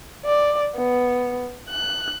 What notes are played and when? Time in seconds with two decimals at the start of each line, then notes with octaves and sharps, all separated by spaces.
0.25 D5
0.75 B3
1.69 F#6